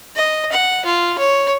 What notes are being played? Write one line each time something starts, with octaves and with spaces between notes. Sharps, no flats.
D#5
F#5
F4
C#5